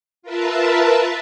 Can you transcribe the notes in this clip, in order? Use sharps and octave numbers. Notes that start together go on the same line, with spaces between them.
F4 A#4 B4 E5 A5